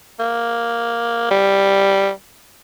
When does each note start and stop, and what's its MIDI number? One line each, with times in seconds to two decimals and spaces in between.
0.20 1.28 58
1.31 2.09 55